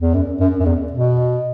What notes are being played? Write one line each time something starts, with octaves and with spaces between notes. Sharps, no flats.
E2
F#2
F#2
F#2
E2
B2